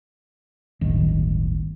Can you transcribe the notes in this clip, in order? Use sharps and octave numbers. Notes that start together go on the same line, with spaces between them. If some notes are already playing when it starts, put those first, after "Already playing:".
D1 G1 D#3